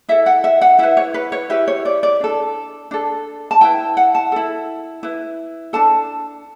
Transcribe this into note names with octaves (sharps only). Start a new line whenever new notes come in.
E4 A4 E5
F#5
E5
F#5
E4 B4 E5
C#5
B4
C#5
E4 G4 B4 E5
C#5
D5
D5
D4 A4
D4 A4
A5
E4 B4 G5
F#5
A5
E4 A4
E4 B4
D4 A4 A5